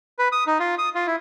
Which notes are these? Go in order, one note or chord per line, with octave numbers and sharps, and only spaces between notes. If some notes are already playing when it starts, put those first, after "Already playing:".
B4
D#6
D#4
F4
D#6
F4
E4